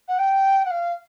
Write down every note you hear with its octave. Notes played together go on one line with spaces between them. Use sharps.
F#5
G5
F#5
F5